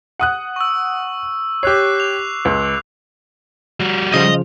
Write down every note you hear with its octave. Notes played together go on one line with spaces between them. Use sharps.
F#5 D#6 F#6
C#6 E6
G4 C#5 D6 F#6 C7
F7
C#2
G3 F#4
C#3 F3 F4 D#5